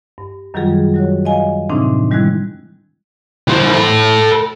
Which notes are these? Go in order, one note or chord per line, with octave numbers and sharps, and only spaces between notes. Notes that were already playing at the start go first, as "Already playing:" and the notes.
G2
F#2 D#3 F#3 G3 F4 G#4
F#3 F#4 C#5
D#5 F5 G#5
A2 C3 E3 C4 D4 D#4
D#3 G3 G#3 E4 F#6 G#6
E3 C5
A4 B5